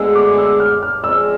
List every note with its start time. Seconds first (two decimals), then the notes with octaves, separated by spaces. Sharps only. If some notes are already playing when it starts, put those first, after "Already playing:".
Already playing: D2 D3 G#3 B3 E6
0.15 D6
0.38 E6
0.60 F6
0.82 F6
1.04 F3 G#3 C4 G#4 D5 E6